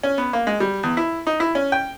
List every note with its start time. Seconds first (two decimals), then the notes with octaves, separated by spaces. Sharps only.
0.03 C#4
0.18 B3
0.33 A#3
0.47 G#3
0.60 G3
0.83 E2
0.97 E4
1.27 D#4
1.40 E4
1.55 C#4
1.72 G5